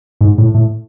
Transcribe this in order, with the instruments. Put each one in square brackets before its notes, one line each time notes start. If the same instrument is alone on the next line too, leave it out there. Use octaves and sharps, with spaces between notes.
[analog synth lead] G#2
A2
A2